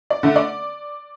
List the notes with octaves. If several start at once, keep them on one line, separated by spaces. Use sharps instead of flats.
D5
D3 A3
D5